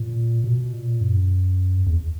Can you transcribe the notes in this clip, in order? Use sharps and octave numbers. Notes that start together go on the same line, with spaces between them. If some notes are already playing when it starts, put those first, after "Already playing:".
Already playing: A#2
B2
A#2
F#2
E2